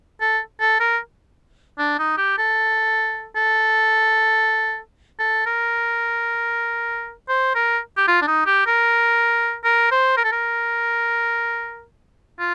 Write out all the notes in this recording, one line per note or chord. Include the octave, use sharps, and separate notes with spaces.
A4
A4
A#4
D4
D#4
G4
A4
A4
A4
A#4
C5
A#4
G4
F4
D4
D#4
G4
A#4
A#4
C5
A#4
A4
A#4
F4